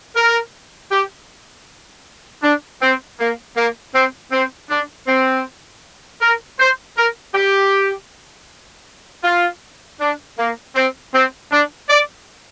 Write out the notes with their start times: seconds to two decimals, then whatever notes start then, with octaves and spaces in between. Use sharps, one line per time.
0.16 A#4
0.91 G4
2.42 D4
2.81 C4
3.19 A#3
3.56 A#3
3.94 C4
4.32 C4
4.70 D4
5.07 C4
6.21 A#4
6.59 C5
6.97 A#4
7.35 G4
9.24 F4
10.00 D4
10.38 A#3
10.76 C4
11.13 C4
11.51 D4
11.89 D5